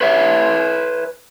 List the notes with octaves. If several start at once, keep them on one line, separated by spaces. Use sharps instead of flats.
B4 C#5 E5